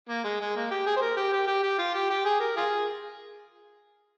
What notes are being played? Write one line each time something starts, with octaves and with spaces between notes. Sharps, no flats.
A#3
G#3
G#3
A#3
G4
G#4
C5
A#4
G4
G4
G4
G4
F4
G4
G4
G#4
A#4
F4 G#4